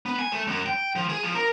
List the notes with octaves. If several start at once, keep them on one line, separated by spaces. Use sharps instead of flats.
B3
G#5
A3
F#2
G5
F3
G#4
F3
A#4